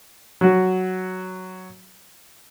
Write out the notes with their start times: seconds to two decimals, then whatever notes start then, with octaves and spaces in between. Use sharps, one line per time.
0.41 F#3 F#4